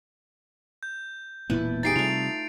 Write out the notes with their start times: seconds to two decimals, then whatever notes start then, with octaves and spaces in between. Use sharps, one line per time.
0.83 G6
1.50 E1 A#2 B3 E4 B4 A5
1.83 D#4 G4 G#4 A6 C7 D7
1.96 C3 G3 A3 F4 F7